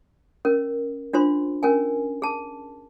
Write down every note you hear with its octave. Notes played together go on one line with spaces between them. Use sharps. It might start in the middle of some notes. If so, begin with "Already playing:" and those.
C#4 A#4
D4 F4 C5 C6
C#4 A#4 G#5
G#4 A5